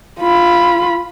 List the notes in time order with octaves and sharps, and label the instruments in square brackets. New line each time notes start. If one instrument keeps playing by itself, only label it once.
[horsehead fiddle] F4 B5